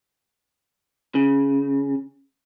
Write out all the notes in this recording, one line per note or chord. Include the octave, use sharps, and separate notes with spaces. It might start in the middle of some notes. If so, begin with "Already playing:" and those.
C#3